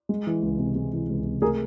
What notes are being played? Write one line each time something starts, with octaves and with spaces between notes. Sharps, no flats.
G#3
E3
C#2
C3
G#3
E3
C#2
C3
A3 G#4 A#4